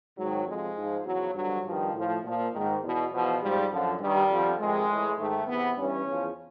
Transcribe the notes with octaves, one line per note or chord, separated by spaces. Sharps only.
G#2 D#3 F#3
F2 C3 F3 G#3
G#2 F3
E2 C#3 F3 F#3
G2 D3 F3 F#3
G2 D#3 F3
A2 F3
A#2 F3
G#2 D#3
E2 B2
E2 B2 F3
G#2 F3 G3
F#2 D3 F3
G2 D#3 G3
F2 D3 F3
F2 C3 D#3 G#3
A2 E3
G#2 D#3 A3
E2 C3 E3 B3
G2 E3 C#4
E2 C#3 F3